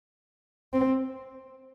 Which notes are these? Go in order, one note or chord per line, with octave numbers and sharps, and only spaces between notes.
C4